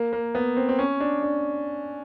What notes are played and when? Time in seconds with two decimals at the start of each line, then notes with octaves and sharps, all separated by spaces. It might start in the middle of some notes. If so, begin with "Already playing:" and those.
Already playing: A#3
0.13 A#3
0.35 B3
0.57 C4
0.69 C4
0.79 C#4
1.00 D4
1.23 D4